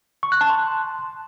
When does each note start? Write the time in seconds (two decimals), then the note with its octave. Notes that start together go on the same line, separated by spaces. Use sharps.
0.23 C#6
0.32 F#6
0.41 A5
0.50 C6